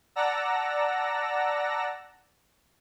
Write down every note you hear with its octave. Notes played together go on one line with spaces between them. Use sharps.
D5 F#5 A5 A#5 E6 A#6